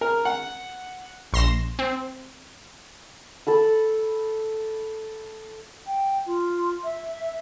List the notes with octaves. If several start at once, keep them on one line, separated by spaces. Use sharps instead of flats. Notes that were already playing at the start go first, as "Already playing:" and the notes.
A#4
F#5
A#1 C6 A#6 E7
C4
A4 B5 E6
G5
F4
E5